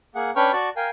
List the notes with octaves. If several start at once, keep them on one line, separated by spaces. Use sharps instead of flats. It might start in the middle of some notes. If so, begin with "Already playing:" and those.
A#3 G#4 F#5
C#4 D4 B4 G5 C#6 F6
F#4 D5 A5 C#6 F#6
A#4 F5 G5 G#5